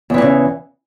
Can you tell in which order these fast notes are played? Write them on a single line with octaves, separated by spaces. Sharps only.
E2 E3 A2 C#3